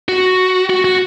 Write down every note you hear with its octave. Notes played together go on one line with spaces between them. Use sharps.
F#4
F#4
F#4